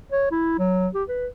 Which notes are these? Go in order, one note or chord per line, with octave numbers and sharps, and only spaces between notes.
C#5
E4
F#3
G4
B4